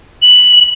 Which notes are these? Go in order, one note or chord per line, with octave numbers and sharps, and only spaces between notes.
F#7